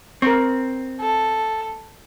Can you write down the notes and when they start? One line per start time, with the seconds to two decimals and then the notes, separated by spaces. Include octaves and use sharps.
0.22 C4 A#4 C#6
1.01 A4